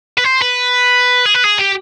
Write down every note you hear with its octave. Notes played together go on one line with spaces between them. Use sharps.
B4
C5
B4
G#4
B4
G#4
G4